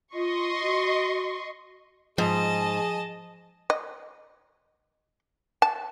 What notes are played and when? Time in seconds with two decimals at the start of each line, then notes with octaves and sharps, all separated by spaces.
0.13 F4 D#5 C6 C#6
0.61 F#4
2.18 G#2 F3 G#4 D#5 A5
3.70 D#5
5.62 A5